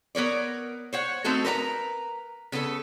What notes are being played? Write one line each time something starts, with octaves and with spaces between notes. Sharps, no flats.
B3 A#4 C#5 D5
C5 C#5 F#5
A3 C4 D#4 F#4 A4
A#4 B4 D5 A#5
C#3 B3 F4 A4